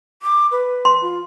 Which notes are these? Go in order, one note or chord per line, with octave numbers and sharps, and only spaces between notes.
D6
B4
C6
F4